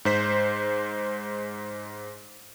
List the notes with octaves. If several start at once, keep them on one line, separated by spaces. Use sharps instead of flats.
G#2 C5 B6